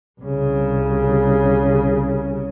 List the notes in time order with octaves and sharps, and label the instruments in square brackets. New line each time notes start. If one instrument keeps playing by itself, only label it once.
[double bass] C2 C#3